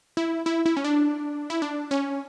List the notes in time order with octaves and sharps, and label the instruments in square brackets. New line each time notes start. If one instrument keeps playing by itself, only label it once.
[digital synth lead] E4
E4
E4
C#4
D4
E4
D4
C#4